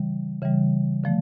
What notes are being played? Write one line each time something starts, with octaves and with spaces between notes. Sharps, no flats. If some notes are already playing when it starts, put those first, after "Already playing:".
Already playing: C#3 E3 G3
C#3 E3 G3
D3 F3 A3